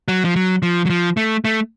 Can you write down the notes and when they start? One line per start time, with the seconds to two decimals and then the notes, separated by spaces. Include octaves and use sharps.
0.08 F#3
0.25 F3
0.36 F#3
0.62 F3
0.86 F#3
0.90 F3
1.17 A3
1.45 A3